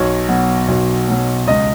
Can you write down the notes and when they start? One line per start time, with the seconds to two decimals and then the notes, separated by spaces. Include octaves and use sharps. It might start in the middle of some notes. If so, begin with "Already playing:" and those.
Already playing: B1 C#5
0.28 B2 F#3
0.68 B1
1.08 B2 F#3
1.47 C#2 D#5